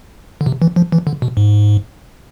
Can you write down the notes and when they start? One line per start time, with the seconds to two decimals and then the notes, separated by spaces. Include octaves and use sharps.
0.41 D3
0.46 C3
0.62 E3
0.76 F3
0.92 E3
1.07 D3
1.22 B2
1.37 G#2